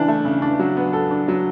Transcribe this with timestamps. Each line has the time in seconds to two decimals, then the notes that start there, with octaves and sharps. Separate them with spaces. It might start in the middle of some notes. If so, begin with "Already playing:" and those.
Already playing: C#3 E3 D4
0.08 A3
0.25 C#3
0.42 D4
0.59 F#3
0.77 B3
0.93 A4
1.11 D4
1.28 F#3